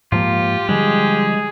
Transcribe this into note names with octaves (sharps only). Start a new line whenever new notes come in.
G#2 F3 A#3 F4 G4
D3 F3 G3 G#3 G#4